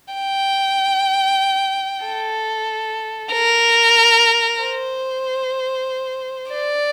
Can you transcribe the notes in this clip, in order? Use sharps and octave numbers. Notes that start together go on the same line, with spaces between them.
G5
A4
A#4
C5
D5